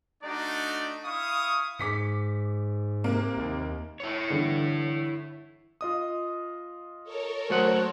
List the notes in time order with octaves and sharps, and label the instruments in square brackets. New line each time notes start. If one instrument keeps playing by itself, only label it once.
[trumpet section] A3 D4 D#4 F#4 D5
E4 F5 C#6 D#6
[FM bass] G#2 [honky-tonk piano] D6 B6 C#7
[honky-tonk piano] C3 A#3
[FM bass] D#2
[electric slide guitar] E4 C#5
[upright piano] G2 D3 E3
[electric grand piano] F4 D#5 D#6
[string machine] A4 A#4 C#5
[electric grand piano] F#3 [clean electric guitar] A3 F#5 [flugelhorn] C5